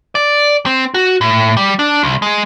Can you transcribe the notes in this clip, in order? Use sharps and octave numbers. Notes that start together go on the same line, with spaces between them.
D5
C4
F#4
A2
G3
D4
C2
G#3